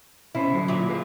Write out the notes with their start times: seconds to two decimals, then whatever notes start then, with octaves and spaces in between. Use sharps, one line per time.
0.35 B2 C#4 E4 C5
0.52 D3 F#3 F#4
0.68 A#2 F4 E5
0.89 G#4 B4 F5